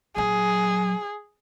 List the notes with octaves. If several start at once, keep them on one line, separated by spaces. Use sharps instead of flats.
A#2 F#3 G#4